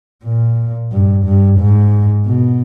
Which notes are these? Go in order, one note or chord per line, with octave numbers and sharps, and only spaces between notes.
A#2
G2
G2
G#2
B2